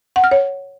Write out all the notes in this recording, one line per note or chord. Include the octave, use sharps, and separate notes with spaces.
F#5
F6
C#5